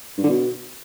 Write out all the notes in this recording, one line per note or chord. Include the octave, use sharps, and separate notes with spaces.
G2
D3
B2